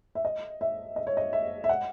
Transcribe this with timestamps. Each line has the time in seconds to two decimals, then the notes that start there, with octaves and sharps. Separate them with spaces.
0.15 E5
0.25 D#5
0.61 E5
0.96 D#5
1.07 C#5
1.17 D#5
1.33 E5
1.64 E5
1.69 F#5